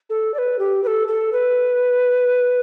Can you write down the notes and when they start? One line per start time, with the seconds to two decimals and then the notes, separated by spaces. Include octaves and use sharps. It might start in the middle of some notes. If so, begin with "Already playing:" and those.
0.10 A4
0.34 D5
0.38 B4
0.59 G4
0.83 B4
0.87 A4
1.08 A4
1.32 B4